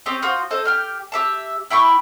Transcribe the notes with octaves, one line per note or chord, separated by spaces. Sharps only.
C4 G4 C#5 D#5
F4 F#4 C5 D#6
A4 C5 D#5
G4 G5 F6
G4 E5 A5
E4 G5 B5 C#6